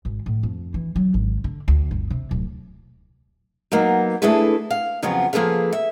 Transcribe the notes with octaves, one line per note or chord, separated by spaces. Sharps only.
G#1
A2
F2
E3
F#3
G#1
D3
D2
G1
C3
D1
F#3 A#3 B3 D#4
A3 D4 E4 G#4 A4 B4
F5
F2 C#3 F3 F#3 B3 F4
F3 A#3 G#4 A4 B4 F5
E5